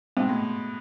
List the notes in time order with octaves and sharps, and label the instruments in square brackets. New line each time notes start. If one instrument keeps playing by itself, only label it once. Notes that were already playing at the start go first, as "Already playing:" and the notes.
[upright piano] G#2 B2 [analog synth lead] C4
[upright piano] A2